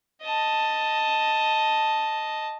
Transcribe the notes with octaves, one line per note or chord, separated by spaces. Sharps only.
D#5 A5